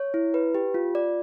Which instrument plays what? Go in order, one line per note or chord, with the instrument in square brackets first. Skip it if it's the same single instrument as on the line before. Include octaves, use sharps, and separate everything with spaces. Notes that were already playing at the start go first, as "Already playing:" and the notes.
Already playing: [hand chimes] C#5
E4
B4
G4
F4
D5